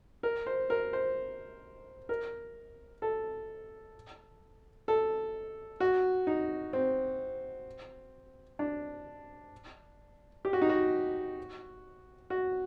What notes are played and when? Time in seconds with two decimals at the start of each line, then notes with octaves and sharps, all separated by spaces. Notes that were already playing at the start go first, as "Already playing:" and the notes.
0.23 A#4
0.46 C5
0.70 A#4
0.93 C5
2.09 A#4
3.02 A4
4.88 A4
5.80 F#4
6.27 D#4
6.73 C4
8.59 D4
10.45 G4
10.53 F#4
10.62 D#4
10.69 F#4
12.30 F#4